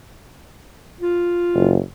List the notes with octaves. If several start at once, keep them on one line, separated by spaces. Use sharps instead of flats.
F4
F#1